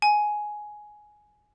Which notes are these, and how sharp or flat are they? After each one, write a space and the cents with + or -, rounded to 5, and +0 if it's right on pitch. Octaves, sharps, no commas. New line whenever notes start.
G#5 +10